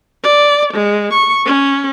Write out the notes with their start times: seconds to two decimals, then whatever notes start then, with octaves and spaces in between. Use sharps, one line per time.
0.23 D5
0.74 G#3
1.13 C#6
1.46 C#4